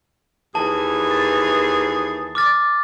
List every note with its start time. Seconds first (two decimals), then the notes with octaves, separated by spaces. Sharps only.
0.55 D#2 E3 G#4 A5
1.11 A6
2.35 D6 F6 A6